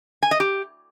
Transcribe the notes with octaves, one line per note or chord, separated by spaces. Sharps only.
G#5
D#5
G4